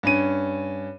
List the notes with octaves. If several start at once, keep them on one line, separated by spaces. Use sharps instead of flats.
G2 C#4 D#7